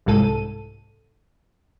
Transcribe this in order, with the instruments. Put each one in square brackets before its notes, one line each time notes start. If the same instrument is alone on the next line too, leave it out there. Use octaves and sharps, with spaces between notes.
[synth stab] G1 C2 G#2 A4 D#7